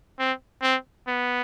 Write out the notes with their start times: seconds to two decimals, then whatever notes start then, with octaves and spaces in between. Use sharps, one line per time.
0.19 C4
0.62 C4
1.08 B3